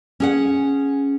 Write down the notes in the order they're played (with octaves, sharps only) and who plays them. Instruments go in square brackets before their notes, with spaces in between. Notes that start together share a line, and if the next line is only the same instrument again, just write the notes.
[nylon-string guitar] C#4 G#4 F#5